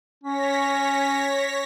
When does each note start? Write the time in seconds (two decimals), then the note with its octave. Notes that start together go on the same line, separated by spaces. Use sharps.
0.24 C#4 C#5 A#6 B6